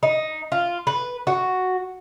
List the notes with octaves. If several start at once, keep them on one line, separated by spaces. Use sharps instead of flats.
D#4
F4
B4
F#4